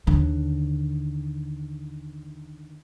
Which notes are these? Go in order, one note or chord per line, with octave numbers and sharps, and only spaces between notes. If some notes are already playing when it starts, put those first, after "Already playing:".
D#2 D3